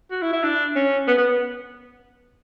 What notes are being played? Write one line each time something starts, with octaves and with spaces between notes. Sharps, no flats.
F#4
E4
E4
D4
C#4
B3
B3